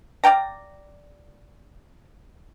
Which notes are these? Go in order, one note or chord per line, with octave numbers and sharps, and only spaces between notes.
D5 F5 G5 A#5